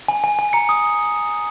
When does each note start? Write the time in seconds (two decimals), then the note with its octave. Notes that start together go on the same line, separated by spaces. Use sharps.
0.08 G#5
0.24 G#5
0.39 G#5
0.53 A#5 C#7
0.69 D#6